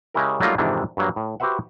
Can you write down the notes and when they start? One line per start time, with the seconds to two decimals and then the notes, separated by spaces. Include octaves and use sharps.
0.14 C#3 G#3 C#4 E4 G4 A#4
0.40 F#3 G3 A3 A#3 D#4 F4
0.58 F2 G#2 C3 D#3 E3 D4
0.97 G2 F#3 A#3
1.16 A2
1.40 F#4 G4 B4 C5 E5 F#5